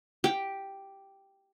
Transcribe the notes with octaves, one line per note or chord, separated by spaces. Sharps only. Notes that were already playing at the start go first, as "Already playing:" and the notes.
G4